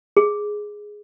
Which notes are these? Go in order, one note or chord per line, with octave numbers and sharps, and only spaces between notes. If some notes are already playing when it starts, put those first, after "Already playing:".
G#4